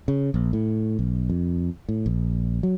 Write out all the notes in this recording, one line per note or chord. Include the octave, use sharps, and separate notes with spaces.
C#3
A#1
A2
B1
F2
A2
A#1
F#3